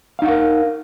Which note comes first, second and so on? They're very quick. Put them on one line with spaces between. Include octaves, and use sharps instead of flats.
F5 D#4 F#5 A#4